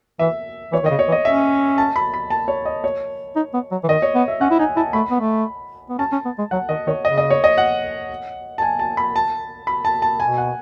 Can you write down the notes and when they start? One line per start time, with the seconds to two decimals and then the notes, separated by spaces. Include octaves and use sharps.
0.19 E3 E5
0.72 E3 C#5
0.83 D#3
0.86 C#3 D#5
0.99 C#5
1.08 E3
1.12 D#5
1.25 C#4 E5
1.78 A5
1.96 B5
2.14 B5
2.30 A5
2.48 C#5
2.65 D#5
2.84 C#5
3.36 D#4
3.54 B3
3.71 F#3
3.83 E3
3.89 D#3 D#5
4.02 C#5
4.15 B3
4.28 E5
4.41 C#4 F#5
4.51 E4
4.59 D#4 G#5
4.76 E4 A5
4.93 A3 B5
5.10 B3
5.20 A3
5.89 B3
5.99 C#4 A5
6.12 C#4
6.25 B3
6.39 G#3
6.51 F#3 F#5
6.69 D#3 D#5
6.87 D#3 C#5
7.05 C#3 D#5
7.18 D#5
7.30 C#5
7.44 D#5
7.58 F#5
8.58 A5
8.62 G#5
8.79 A5
8.97 B5
9.16 A5
9.67 B5
9.85 A5
10.02 A5
10.20 B2 G#5
10.38 F#5